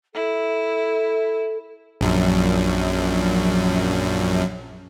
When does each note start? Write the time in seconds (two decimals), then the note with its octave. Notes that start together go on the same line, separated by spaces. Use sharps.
0.14 E4 A4
2.01 A#1 F#2